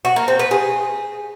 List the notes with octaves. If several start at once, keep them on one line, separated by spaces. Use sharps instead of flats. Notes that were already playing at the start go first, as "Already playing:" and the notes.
F#4
A#3
C4
B4
G#4